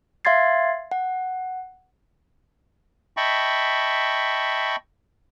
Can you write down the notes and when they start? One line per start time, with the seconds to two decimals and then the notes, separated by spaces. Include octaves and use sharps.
0.25 E5 F5 C6 G#6 A6 C7
0.92 F#5
3.17 D#5 E5 G5 A5 B5 C#6